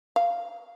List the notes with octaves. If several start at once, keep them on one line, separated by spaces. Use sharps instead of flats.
F5